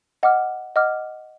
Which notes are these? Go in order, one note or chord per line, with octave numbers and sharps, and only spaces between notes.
D#5 F#5 D6 F6
D#5 F#5 D6 F6